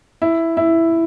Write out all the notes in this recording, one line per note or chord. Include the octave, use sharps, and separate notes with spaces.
E4
E4